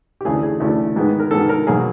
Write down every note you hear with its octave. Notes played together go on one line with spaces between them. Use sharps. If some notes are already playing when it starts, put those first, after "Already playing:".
G4
D2 C#3 E3 A3 G#4
G#4
D2 C#3 E3 A3
G#2 D#3 G#3 B3
A#4
G#2 D#3 G#3 B3 A4
A#4
B2 F#3 A#3 G#4